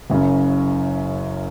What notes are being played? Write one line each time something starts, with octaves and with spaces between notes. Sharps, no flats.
F#1 F#2 C#3